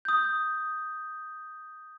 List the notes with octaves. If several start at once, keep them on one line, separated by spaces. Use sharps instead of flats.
D#6 G6